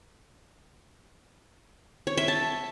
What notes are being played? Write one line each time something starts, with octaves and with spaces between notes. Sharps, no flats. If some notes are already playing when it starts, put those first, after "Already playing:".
C#5
E5
A5